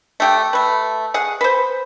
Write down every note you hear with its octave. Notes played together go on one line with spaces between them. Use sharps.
A3 G4
A3 B4
G#4 F#5
B4 C5